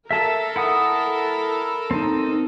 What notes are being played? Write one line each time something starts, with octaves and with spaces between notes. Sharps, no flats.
A4 A#4 E5 A5
E4 F#5 D#6
C4 D#4